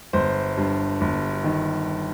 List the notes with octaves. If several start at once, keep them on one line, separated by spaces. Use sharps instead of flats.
G1 C5 C6
G2
G1
D#3